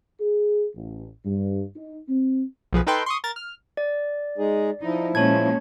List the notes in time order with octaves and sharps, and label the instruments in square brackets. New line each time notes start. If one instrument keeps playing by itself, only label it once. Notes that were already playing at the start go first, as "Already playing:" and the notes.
[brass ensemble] G#4
A1
G2
D#4
C4
[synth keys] B1 F3 G#4 B4
D#4 A4 B4 G5 C6
C6 C#6 D#6
A#4 A6
F6
[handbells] D5
[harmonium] G#3 D#4 G#4
[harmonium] F3 E4 [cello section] D#4
[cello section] A#2 G#3 C#4 [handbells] C#5 A5 G#6